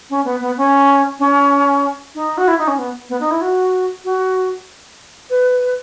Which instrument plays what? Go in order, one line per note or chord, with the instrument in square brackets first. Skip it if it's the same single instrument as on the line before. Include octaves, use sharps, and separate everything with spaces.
[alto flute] C#4
B3
B3
C#4
C#4
D#4
F#4
E4
D#4
C#4
B3
B3
D#4
E4
F#4
F#4
B4